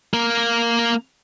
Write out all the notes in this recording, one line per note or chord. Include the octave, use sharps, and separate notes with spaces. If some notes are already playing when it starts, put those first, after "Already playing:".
A#3 A#4